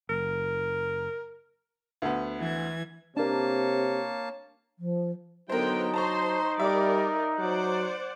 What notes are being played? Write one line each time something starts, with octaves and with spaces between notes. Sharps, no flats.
F#1 A#4
D2 B3
E3 G#6
C3 A#3 D4 A#4 C#5 A5
F3
D3 F#3 B3 D#4 A#4 C5 G5
C5 A5 A#5 C6 C#6
G3 A#4 D5 E5 D6
F#3 C5 D5 F#5